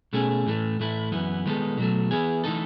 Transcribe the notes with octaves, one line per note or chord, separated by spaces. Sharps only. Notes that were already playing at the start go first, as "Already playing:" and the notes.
B2 A3 C#4 G#4
A2 E3 A3
A2 E3 A3 E4
F#2 E3 B3 E4
D#3 G#3 B3 D#4 A4
B2 F#3 A3
E3 B3 E4 G#4
E3 A3 D#4 A4